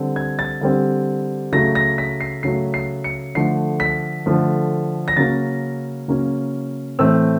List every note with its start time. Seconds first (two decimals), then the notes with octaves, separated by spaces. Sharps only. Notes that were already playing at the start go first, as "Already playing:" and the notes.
Already playing: D3 G3 C4
0.16 G#6
0.39 A6
0.61 D3 G3 C4
1.52 C#3 F#3 A3 A#6
1.75 A#6
1.98 B6
2.21 C7
2.43 C#3 F#3 A3 C7
2.74 C7
3.04 C#7
3.35 D3 F3 A3 C7
3.80 B6
4.26 D3 F3 A3
5.08 A#6
5.17 C#3 F#3 A#3 C#4 A6
6.08 C#3 F#3 A#3 C#4
6.99 A2 E3 A3 C4 E6